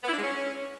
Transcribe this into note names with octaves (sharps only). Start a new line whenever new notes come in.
B3
E4
D4
G#3
C#4